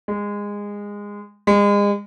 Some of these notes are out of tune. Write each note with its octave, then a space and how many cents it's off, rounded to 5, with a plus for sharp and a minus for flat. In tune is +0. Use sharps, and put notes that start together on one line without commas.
G#3 -20
G#3 -35